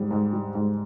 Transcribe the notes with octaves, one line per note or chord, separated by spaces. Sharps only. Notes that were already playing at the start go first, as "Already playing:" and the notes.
Already playing: G#2 G3
G#2
G3
G#2